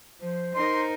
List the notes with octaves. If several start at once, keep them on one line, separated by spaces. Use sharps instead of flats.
F3 C5
D#4 A#4 C6